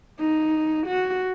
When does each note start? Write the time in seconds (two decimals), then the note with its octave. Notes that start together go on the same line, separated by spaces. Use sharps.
0.20 D#4
0.87 F#4